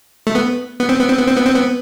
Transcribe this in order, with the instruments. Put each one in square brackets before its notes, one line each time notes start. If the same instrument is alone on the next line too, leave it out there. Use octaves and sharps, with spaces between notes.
[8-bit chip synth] A3
B3
B3
C4
B3
C4
B3
C4
B3
C4
B3